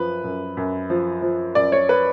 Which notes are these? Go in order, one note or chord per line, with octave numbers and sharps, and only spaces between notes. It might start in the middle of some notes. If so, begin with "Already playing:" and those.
Already playing: F#2 F3 B4
F#2
F#2
F3
F3
F#2 D5
C#5
B4